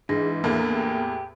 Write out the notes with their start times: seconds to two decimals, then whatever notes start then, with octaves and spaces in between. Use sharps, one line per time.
0.09 G#2 E3 D4 G#4 A#6
0.44 E2 A2 A#3
0.75 G4